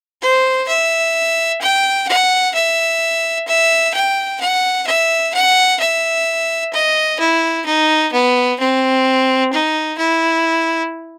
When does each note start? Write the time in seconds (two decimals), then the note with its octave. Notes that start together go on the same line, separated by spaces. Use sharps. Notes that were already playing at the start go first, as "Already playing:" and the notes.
0.21 C5
0.68 E5
1.61 G5
2.08 F#5
2.54 E5
3.47 E5
3.94 G5
4.40 F#5
4.86 E5
5.34 F#5
5.79 E5
6.73 D#5
7.20 E4
7.65 D#4
8.12 B3
8.59 C4
9.52 D#4
9.98 E4